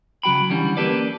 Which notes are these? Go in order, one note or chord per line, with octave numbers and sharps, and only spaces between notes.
C#3 F#3 F#4 G5 B5
D3 E3 G3 C#4
A#3 G4 A4 B4 D5